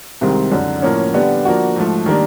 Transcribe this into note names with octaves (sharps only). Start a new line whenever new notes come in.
C2 C3 D#3 G#3 C4
F#2 D3 F#3
A2 F3 A#3 C#4
D3 G3 B3 D4 G4
F3 A#3 D4 F#4
G#2 F3 A3
D#3 G3 A#3 D4